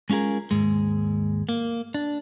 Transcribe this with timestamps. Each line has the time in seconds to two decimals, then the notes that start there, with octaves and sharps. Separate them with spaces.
0.10 G#3 C#4 F4 G#4 A#4
0.51 D#2 G#2 G#3
1.49 A#3
1.94 D4